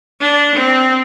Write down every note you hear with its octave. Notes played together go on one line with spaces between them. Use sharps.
D4
C4